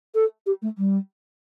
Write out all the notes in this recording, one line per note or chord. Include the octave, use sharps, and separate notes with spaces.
A4
G4
A3
G3